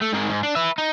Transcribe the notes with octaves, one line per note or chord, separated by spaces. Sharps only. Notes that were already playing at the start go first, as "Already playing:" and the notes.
A3
G#2 D#3
G#2
D4
B4 E5
D#4